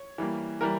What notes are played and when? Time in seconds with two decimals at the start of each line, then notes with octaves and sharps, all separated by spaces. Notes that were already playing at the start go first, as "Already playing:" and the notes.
Already playing: C#5
0.18 E3 G3 A#3
0.61 E3 G3 A#4